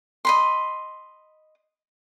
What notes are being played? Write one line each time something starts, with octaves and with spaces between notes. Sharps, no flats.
D#5 B5 C6